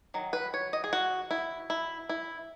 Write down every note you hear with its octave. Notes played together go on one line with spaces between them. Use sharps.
D#3 F#3
B4
C#5
D#5
G#4
F#4
E4
E4
E4